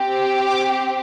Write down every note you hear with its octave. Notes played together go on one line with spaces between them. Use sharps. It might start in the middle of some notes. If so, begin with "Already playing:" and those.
Already playing: C4 G4
D6